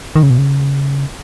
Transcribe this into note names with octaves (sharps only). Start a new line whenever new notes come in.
D#3
C#3
B2
C#3